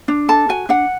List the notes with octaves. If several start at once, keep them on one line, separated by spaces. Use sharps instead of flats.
D4
A4 A5
F#4 G#5
D4 F#5